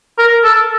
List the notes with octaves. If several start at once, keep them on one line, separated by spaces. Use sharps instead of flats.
A#4
A4